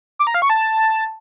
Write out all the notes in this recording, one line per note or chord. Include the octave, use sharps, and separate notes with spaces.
D6
A#5
F5
C#6
A5